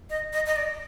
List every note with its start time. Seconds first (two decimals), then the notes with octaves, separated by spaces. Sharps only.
0.10 D#5
0.33 D#5
0.46 D#5
0.56 D5